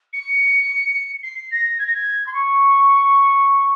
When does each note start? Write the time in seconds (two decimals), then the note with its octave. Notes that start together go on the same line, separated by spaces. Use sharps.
0.13 C#7
1.23 C7
1.51 A#6
1.79 G#6
1.87 A#6
1.94 G#6
2.27 C6
2.34 C#6